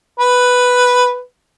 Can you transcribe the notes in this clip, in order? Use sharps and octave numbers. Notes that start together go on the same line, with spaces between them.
B4